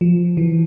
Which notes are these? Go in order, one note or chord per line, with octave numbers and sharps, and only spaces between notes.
F3
E3